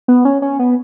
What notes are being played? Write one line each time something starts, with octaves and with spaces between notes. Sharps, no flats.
B3
C#4
C#4
B3